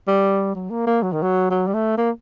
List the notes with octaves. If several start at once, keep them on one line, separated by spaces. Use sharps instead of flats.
G3
F#3
A#3
A#3
F#3
D#3
F#3
F#3
G3
A3
A#3